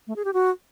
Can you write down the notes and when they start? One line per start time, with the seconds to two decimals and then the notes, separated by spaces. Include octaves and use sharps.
0.07 A3
0.16 G#4
0.25 G4
0.34 F#4